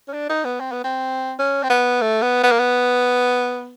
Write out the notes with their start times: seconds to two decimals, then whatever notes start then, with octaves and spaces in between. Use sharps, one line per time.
0.08 C#4
0.13 D4
0.29 D#4
0.45 B3
0.60 C4
0.72 B3
0.84 C4
1.39 C#4
1.63 C4
1.70 B3
2.01 A3
2.22 B3
2.43 B3
2.51 A#3
2.60 B3